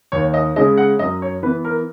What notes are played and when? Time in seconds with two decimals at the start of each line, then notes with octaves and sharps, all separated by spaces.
0.12 D#2 C#5
0.34 D#5
0.56 C#3 G#3 D#5
0.77 F#5
0.99 F#2 D#5
1.22 C#5
1.43 E3 B3 B4
1.65 A#4